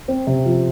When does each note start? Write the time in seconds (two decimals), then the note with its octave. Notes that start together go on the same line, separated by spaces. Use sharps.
0.08 C4
0.27 C3
0.46 F3